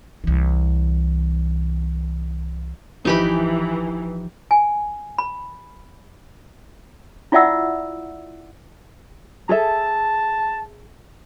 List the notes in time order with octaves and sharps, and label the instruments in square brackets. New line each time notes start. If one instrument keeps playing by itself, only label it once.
[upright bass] C2 E3
[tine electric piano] G#1 F3 [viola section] E3 [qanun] D#4 G4 B5
[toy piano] G#5
B5
E4 F4 D5 E5 F#5 E6
[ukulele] G#4 A4 E5 [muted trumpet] A5